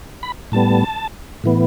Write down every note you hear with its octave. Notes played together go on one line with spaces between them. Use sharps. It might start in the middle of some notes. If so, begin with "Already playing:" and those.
B5
A2 G3 B3 A5
A2 E3 B3